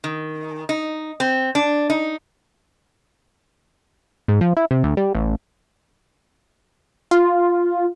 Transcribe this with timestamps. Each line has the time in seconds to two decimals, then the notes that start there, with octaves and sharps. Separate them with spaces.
0.04 D#3
0.69 D#4
1.20 C4
1.55 D4
1.90 D#4
4.28 G#2
4.41 F3
4.57 E4
4.71 C3
4.84 D2
4.97 G3
5.15 A1
7.11 F4